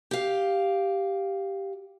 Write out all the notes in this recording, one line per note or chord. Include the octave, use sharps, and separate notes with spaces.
G4 F5